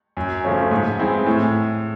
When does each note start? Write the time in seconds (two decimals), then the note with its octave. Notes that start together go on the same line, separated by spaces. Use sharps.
0.17 F#2
0.44 C#3 F3 A3 C#4
0.71 G#2
0.99 E3 G#3 C4 E4
1.26 A2